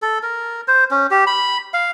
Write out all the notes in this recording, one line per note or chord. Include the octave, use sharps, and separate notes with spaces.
A4
A#4
C5
C#4
G4
B5
F5